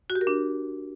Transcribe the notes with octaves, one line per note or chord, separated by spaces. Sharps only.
F#4
G4
A#4
D4